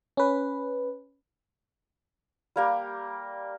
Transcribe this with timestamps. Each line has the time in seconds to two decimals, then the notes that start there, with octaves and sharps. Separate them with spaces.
0.17 C#4 B4
2.56 G3 A#3 G4